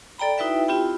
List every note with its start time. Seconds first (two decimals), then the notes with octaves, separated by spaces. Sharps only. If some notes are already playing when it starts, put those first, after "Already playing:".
0.18 A4 D5 G5 A#5 B5
0.38 D#4 E4 F#4 B4 E5 G5
0.68 C4 E4 F4 G4 G5 B5